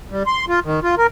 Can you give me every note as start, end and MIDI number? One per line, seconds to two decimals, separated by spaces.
0.11 0.23 55
0.27 0.45 84
0.48 0.60 65
0.65 0.80 51
0.83 0.95 65
0.98 1.07 70